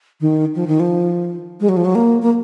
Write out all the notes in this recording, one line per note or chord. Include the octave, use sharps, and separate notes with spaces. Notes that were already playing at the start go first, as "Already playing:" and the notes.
D#3
F3
D#3
F3
G#3
F#3
F3
F#3
A#3
A#3